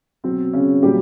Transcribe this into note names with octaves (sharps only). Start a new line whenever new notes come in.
B2 F#3 C4
C#3 C#4
A#2 F#3 G3 G4